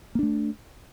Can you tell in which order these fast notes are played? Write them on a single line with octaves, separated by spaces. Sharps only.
A#3 D4 A3